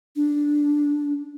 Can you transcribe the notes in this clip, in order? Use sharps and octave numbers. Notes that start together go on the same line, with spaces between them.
D4